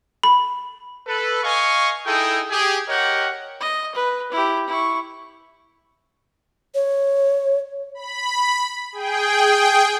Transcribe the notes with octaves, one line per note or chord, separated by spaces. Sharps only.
B5
A4 B4
D#5 F5 G#5 C#6
D#4 E4 G#4 A4 D#5 G5
G4 G#4
G4 A#4 C#5 D#5 F#5 G5
D#5
B4
E4 G4
E4 C#6
C#5
B5
G#4 G5